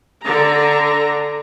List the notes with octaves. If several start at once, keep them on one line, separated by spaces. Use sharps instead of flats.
D3 A#5